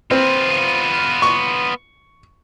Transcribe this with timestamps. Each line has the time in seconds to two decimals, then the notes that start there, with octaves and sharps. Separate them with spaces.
0.11 B3 C4 F4
1.22 C#6